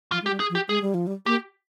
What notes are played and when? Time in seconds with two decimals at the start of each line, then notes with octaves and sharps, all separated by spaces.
0.12 F3 F4
0.22 G#3 G4
0.31 G3
0.40 G#4
0.50 F3
0.55 G4
0.68 G#3 G#4
0.81 G3
0.94 F3
1.07 G3
1.26 A#3 G4